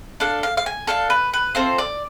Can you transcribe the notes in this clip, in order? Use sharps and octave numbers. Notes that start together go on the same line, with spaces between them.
D4 A4 F5
F5
F5
G#5
D4 A4 F5
B4
B4
C4 F4 A4 C5
D5